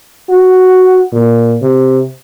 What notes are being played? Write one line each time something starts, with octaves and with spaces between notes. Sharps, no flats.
F#4
A#2
C3